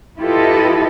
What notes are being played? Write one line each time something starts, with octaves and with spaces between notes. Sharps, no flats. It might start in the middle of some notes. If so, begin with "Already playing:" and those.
E4 F4 G4 A4 B4 D#5